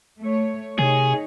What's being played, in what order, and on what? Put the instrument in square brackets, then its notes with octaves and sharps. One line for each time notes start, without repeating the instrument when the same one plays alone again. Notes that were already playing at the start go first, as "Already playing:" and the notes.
[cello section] A3 C#5
[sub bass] C3 [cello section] D#3 D#4 C#5 [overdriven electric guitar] G#4